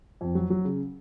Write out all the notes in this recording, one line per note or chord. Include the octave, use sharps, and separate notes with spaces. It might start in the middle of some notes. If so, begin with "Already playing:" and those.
F2
F#3
F#3
C#3